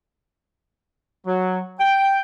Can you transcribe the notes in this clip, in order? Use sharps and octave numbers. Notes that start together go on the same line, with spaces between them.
F#3
G5